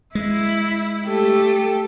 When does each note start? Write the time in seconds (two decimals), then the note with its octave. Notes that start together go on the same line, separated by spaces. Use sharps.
0.15 G#3 E4
1.07 A3 G4 A4